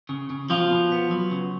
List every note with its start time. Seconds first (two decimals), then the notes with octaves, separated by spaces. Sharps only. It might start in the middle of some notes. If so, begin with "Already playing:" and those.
0.09 C#3
0.30 C#3
0.50 B2 F3 F4
0.71 B2
0.92 B3
1.11 F#3
1.31 C#3